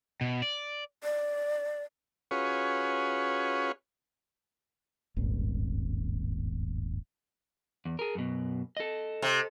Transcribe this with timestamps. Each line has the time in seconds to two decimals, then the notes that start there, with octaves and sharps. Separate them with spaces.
0.21 B2
0.42 D5
1.03 D5
2.31 C#4 F4 F#4 G#4 B4 C#5
5.17 D#1 G#1 G2
7.85 E2
7.99 G#4 A#4
8.15 F#2 B2
8.77 A4 D#5
9.22 C3